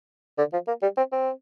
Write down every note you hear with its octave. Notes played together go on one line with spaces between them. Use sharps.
D3
F3
A#3
G3
C4
C4